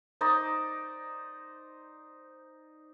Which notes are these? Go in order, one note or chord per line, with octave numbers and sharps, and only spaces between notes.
D#4 C5 D5 D#5